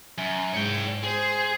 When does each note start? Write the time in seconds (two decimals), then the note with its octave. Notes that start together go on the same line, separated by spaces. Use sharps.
0.18 F#2
0.54 G#2 C#5 G5
1.04 G#4 C5